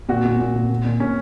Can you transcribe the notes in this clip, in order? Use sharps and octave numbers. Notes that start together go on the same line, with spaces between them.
A#2 F#4
A#2
A#2
A#2
A#2
A#2
A#2 C#4